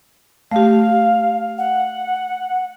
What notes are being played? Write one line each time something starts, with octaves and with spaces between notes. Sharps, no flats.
A3 G4 F5
F#5